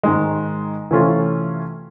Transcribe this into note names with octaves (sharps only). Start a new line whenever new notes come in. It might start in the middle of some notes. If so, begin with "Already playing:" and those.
G#2 D#3 G#3
C3 E3 A3 C#4 F4